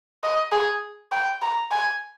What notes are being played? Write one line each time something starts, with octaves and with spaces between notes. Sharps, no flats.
D#5
G#4
G5
A#5
G#5